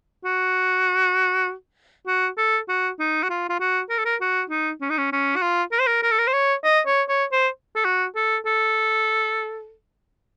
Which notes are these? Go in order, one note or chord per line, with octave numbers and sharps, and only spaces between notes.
F#4
F#4
A4
F#4
D#4
F#4
F4
F4
F#4
A#4
A4
A#4
F#4
D#4
C#4
D#4
C#4
C#4
F#4
F4
A#4
C5
A#4
A#4
A4
A#4
C5
C#5
D#5
C#5
C#5
C5
A4
F#4
A4
A4